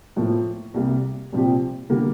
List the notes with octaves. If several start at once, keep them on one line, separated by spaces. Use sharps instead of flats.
A2 F3 A#3
C2 C3 G3 A#3
C2 A#2 F3 C4 G4
D3 G3 A#3